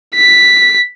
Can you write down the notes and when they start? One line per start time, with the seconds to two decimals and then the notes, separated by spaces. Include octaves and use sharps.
0.15 B6